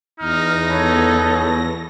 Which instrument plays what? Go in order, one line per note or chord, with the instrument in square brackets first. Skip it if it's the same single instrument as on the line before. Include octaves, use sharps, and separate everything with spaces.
[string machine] E2 A#6 [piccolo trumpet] D#4 [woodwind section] F6
[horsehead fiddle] B3 A4 [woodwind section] B4 C#5